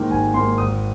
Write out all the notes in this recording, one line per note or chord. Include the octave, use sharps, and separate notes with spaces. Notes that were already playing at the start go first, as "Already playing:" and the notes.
Already playing: G#2 D#3 A#3
G#1 G#5
G#2 D#3 A#3 C6
G#1 D#6